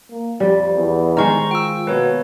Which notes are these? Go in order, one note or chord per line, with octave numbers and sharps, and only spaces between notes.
A#3
F2 G3
E2
D#3 G#3 C5 A#5 C#6
F4 G5 E6
B2 A#3 B4 C#5